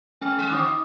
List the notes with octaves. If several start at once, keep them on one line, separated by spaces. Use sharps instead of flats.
G#3 C#4 F6
G3
D3 F#4 C5 D6 D#6
D#4